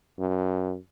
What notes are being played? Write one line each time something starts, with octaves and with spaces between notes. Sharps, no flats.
F#2